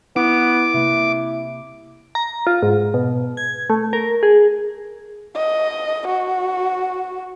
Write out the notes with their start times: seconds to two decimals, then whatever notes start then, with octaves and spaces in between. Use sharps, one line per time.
0.16 B3 E4 D6
0.74 C3 A#3 E4
2.15 A#5
2.47 F4
2.63 G#2
2.94 B2
3.37 G#6
3.70 A3
3.93 A#4
4.23 G#4
5.36 D#5
6.07 F#4